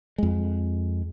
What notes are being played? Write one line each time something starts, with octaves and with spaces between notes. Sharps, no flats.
F2 G#3